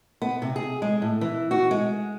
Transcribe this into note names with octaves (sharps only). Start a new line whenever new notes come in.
B3
C3
G#4
G#3
A2
E3
F#4
G#3